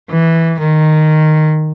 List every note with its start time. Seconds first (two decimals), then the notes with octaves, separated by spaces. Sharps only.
0.10 E3
0.60 D#3